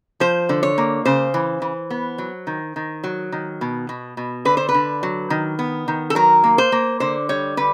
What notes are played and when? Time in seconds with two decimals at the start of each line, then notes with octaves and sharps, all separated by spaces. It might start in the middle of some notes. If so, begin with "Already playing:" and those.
0.20 F3 C5
0.49 D3
0.63 C#5
0.78 A#3
1.05 C#3 C5
1.34 E3
1.62 E3
1.90 B3
2.18 F#3
2.47 D#3
2.76 D#3
3.04 F#3
3.32 D#3
3.61 B2
3.89 B2
4.17 B2
4.45 D3 B4
4.57 C5
4.69 B4
4.74 D3
5.03 F#3
5.30 D#3
5.59 B3
5.88 D#3
6.10 A4
6.15 F#3 A#4
6.44 A#3
6.58 C5
6.72 A#3
7.00 D3 C5
7.29 G3 C#5
7.57 D3 B4